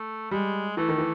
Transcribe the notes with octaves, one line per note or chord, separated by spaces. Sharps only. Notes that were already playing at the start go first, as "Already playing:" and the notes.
Already playing: A3
G3 G#3
E3 A3
D#3
E3